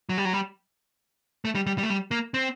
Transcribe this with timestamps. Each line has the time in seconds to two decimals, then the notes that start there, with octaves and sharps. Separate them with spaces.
0.09 F#3
0.18 G3
0.25 F#3
0.33 G3
1.45 A3
1.55 G3
1.67 G3
1.78 G3
1.83 A3
1.90 G3
2.11 A#3
2.34 C4